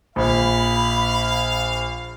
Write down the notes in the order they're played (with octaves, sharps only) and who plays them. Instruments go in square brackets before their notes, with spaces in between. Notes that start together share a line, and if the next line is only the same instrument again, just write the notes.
[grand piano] A#1 [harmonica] F5 [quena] B5